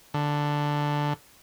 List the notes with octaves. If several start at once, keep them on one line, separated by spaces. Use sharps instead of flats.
D3